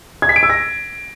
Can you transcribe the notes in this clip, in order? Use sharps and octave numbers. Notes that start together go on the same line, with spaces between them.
G#6
B6
D7
E6
A#6